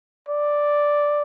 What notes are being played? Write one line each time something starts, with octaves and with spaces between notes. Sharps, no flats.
D5